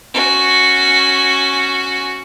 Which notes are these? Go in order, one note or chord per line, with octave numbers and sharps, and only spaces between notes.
C#4 F#4